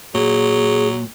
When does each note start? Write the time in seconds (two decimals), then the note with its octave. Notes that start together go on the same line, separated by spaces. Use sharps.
0.15 A#2 F#3 G#4